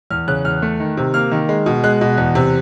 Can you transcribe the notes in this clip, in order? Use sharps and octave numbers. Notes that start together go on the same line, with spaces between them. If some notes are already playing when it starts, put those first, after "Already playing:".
E2 F6
C#3 F#6
E2 F6
A3
D#3
C3
A#3 F6
D#3
G#3
B2
G#3 F#6
B2
E2
C3